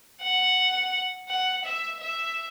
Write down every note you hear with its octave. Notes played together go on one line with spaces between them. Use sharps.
F#5
F#5
E5
E5